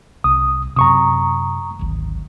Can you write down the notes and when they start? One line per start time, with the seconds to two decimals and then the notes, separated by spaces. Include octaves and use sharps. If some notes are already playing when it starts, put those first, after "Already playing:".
0.24 C2 D#6
0.76 F#2 C3 A#5 C#6 D#6
1.79 D1 G#1